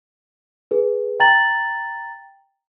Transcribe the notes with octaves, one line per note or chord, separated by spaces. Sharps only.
G#4 B4
G5 A#5 A6 F#7